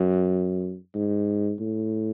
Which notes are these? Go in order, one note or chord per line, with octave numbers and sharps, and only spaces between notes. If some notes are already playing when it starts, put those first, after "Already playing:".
Already playing: F#2
G#2
A2